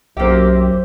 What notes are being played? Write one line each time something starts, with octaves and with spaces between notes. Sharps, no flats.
B1 F#2 A#3 G4 C5 E5